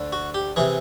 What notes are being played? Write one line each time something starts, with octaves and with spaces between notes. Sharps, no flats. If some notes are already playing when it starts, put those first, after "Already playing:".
Already playing: D2 D3
F#4
G4
C3 E3 G#4